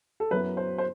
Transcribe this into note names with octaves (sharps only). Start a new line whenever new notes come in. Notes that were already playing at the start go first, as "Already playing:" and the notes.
A4
F#2 F#3 B3 E4 B4
C5
C5